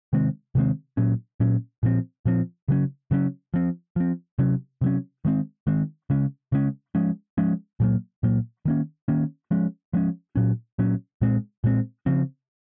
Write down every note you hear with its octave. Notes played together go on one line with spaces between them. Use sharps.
C3 D#3 G#3 C4
C3 D#3 G#3 C4
A#2 F#3 C#4
A#2 F#3 C#4
A#2 F3 C4
A#2 F3 C4
C#3 F#3 C#4
C#3 F#3 C#4
F3 C4
F3 C4
C3 F#3 C#4
C3 F#3 C#4
D#3 G#3 C4
D#3 G#3 C4
C#3 G#3 C#4
C#3 G#3 C#4
F3 G#3 C#4
F3 G#3 C#4
A#2 F#3 A#3
A#2 F#3 A#3
D#3 A#3 C#4
D#3 A#3 C#4
F3 G#3 C#4
F3 G#3 C#4
A#2 F#3 C#4
A#2 F#3 C#4
A#2 G#3 C4
A#2 G#3 C4
C#3 F3 C4